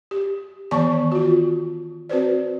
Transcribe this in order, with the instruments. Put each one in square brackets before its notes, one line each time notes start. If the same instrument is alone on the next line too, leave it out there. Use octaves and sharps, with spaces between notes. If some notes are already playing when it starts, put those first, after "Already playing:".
[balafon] G4
D#3 E3 B3 D5 A5 C#6
F4 F#4
C4 F#4 B4 C5 D5